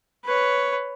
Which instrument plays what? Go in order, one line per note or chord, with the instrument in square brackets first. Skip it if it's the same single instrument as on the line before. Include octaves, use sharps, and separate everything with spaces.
[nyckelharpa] B4 C#5